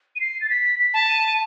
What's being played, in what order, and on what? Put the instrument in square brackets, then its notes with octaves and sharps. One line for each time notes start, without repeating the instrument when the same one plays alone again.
[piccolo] D#7
C7
A6
B6
B6
[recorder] A5
[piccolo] D#7
D#7